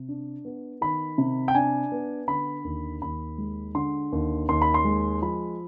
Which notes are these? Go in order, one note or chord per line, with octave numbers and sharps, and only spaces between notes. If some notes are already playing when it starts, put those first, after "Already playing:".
Already playing: C3
D4
B3
D#3 B5
C3
G5
D4 G#5
B3
D3 B5
D#2
D#2 B5
G#3
D3 C6
D#2
D#2 C6
B5
C6
G#3
F3 B5